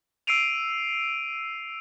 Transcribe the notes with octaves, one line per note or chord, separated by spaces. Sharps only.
E6 C7 D7 D#7 F7